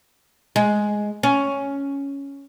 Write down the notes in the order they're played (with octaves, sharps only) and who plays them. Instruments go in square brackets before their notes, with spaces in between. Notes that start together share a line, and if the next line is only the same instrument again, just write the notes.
[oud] G#3
C#4